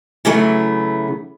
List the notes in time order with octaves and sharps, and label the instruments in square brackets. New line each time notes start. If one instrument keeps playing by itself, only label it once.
[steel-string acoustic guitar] C#3 E3 F#3 A3 B3